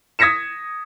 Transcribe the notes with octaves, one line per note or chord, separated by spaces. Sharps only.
D#6 G#6 A#6 B6 C#7 E7